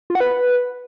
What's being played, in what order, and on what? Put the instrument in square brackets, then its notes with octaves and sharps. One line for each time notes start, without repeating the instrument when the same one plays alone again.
[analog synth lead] F4
F#5
B4